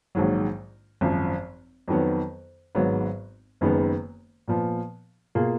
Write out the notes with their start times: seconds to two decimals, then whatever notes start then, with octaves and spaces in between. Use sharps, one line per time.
0.15 A#1 G#2 D#3 F#3
1.01 G#1 F#2 F3
1.88 F2 D#3 F#3 B3
2.75 G#1 G#2 F#3 B3
3.61 F#1 F#2 D#3 G#3 B3
4.48 A#2 F3 B3
5.35 B2 A#3 F4 G#4